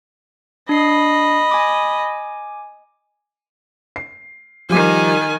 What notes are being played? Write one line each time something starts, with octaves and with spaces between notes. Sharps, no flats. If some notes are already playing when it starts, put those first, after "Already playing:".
D4 D#5 B5 C7
G#5 D6
C7
D#3 F3 G3 G#5 D6